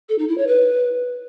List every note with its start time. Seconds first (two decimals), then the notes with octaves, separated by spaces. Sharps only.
0.09 A4
0.18 D#4
0.28 E4
0.37 C#5
0.47 B4